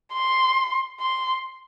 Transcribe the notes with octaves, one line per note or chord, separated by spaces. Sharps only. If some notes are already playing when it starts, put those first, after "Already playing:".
C6
C6